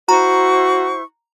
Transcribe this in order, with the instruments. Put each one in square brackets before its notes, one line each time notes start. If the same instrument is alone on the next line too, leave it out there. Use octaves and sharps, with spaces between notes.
[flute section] E4 C5 C#6 [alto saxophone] F#4 [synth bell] A#5